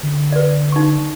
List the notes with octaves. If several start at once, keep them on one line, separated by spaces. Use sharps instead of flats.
D3
B4 D5
D#4 C#6